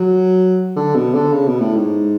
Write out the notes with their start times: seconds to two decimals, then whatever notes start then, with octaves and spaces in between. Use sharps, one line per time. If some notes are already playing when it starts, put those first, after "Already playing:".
Already playing: F#3
0.76 D3
0.95 B2
1.14 D3
1.33 C#3
1.47 B2
1.61 A2
1.75 G#2